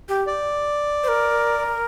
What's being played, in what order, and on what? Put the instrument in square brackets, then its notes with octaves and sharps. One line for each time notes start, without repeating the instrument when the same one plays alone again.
[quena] G4
[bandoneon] D5
[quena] C5
A#4